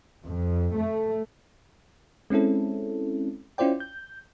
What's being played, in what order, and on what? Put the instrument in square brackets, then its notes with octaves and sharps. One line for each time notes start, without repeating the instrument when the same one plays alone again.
[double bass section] F2
A3
[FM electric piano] G#3 C4 C#4 E4 A4
C#4 E4 F4 C5 D5 G5
G6